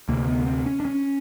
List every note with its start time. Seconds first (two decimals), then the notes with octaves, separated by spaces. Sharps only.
0.09 D2 C3 A#3
0.28 B3
0.46 C4
0.66 C#4
0.80 D4
0.85 C#4